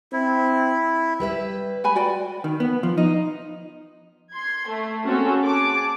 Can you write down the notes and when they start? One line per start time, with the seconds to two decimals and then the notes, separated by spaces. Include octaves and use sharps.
0.12 C4 E4
1.20 G3 B4 E5
1.84 B4 G#5 B5
1.95 F#4 D5 G5
2.44 D#3
2.60 B3
2.83 F3
2.98 D#4
4.32 C6 G#6
4.68 A3
5.06 A#3 C4 C#4 F#4 G#4 A4
5.42 G#4 A5 D6